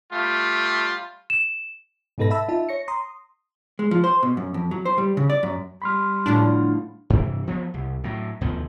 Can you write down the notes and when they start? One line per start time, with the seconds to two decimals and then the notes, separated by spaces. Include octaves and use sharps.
0.12 G3 A3 F4
1.30 E7
2.18 G#2 B2 D#4 A4 B4 A#6
2.30 E5 A5 B5 E6
2.48 D#4 F4 E5 A5
2.69 C#5 A#6 C#7
2.88 A#5 C6 D#6
3.79 G#3
3.91 F3
4.04 C5
4.23 B2
4.37 F#2
4.54 F2
4.71 F#3
4.85 C5
4.98 G3
5.17 C#3
5.30 D5
5.43 F#2
5.82 G3 B5 C6 F6
6.26 A2 D3 F3 D4
7.10 G2 C3 E3
7.47 F3 F#3 B3
7.74 C2
8.04 A2 F#3
8.41 D2 B2 D#3 F3